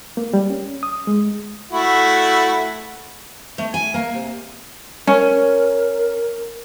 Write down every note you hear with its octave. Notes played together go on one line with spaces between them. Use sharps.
A#3
G3
C#4
D#6
G#3
A3 E4 F#4
A3
G#5
A#3
C3
C#4 A#4